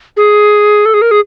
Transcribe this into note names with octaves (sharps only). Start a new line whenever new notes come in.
G#4
A4
G#4
A#4
G#4